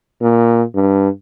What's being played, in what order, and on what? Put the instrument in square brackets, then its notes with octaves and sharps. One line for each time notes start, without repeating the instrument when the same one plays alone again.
[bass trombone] A#2
G2